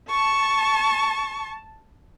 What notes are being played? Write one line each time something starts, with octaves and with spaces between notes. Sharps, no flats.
A5 C#6